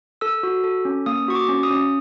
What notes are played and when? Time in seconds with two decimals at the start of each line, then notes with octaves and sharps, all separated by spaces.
0.21 A4 E6
0.43 F#4
0.64 A4
0.85 C#4
1.06 A#3 D#6
1.28 F#4 C#6
1.35 D6
1.49 C#4
1.63 D#6
1.70 C#4